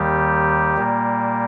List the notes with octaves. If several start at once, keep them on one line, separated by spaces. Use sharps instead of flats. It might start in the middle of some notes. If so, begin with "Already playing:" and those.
Already playing: D#2 D#3 G3 G4
A#2 G3 A#3